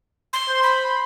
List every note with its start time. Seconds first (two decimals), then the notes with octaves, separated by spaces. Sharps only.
0.33 C6
0.49 C5
0.63 B5